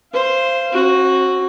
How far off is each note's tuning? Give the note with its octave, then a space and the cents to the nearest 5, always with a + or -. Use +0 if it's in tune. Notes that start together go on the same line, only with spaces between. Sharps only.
C5 +0 F5 -25
C4 +45 F#4 +0